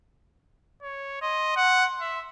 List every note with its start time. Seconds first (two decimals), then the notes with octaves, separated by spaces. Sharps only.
0.82 C#5
1.22 D#5 C6
1.56 F#5
2.00 E5